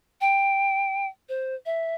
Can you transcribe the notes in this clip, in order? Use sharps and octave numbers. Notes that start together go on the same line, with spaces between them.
G5
C5
E5